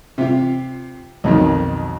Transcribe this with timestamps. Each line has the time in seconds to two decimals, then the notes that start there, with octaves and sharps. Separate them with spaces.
0.18 C3 F4
1.24 B1 F2 D#3